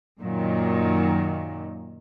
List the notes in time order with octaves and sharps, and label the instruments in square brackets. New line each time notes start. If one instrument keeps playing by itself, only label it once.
[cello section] F#2 A#2 D#3 F#3